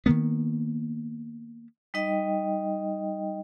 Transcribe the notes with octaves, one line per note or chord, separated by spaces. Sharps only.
D#3 E3 A#3 B3
G3 D#4 D#5 G5